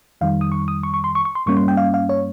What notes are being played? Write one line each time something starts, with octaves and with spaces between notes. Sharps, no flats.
F2 D#3 G3 F5
D#6
C#6
D#6
C#6
C#6
C6
C#6
C#6
C6
G2 G3 A#3 C#4 C#6
C6
G5
F5
F5
C#5